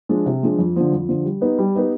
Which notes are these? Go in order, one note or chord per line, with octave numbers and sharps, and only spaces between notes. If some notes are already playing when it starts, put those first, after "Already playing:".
F3 G#3 D4
C3
F3 G#3 D4
F2
D3 F3
F2
D3 F3
G3
B3 D#4 G4 B4
G3
B3 D#4 G4 B4